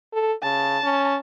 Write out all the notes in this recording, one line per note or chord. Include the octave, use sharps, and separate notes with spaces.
A4
C#3 A5
C#4